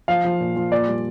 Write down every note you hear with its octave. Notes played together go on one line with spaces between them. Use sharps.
F3 F5
F3
A#2
F3
A#2 D5
G3